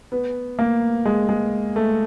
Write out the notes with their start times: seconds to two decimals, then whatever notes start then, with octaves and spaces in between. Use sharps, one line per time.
0.12 B3
0.59 A#3
1.05 G#3
1.29 G#3
1.76 A3